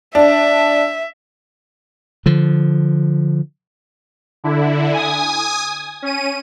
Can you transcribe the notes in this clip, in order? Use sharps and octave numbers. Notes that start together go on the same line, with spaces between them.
D4 E5
D3 F3
D3 E4
G#5 D#6
C#4 D#7